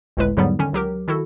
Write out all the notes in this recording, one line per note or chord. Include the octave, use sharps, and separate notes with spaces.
G1 C#2 A2 G#3 B4
E2 G#2 D3 F#3 G3 B3
D3 D#3 C#4
C#2 F#3 G4 A#4
D#3 E4 F#4 A4